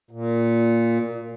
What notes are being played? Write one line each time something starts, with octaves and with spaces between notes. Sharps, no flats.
A#2